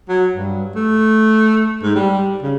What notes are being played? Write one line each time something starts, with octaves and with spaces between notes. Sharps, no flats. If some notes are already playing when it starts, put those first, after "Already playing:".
F#3
G2
A3
G#2
G3
C#3